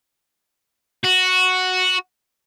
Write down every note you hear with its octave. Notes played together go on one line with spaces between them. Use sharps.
F#4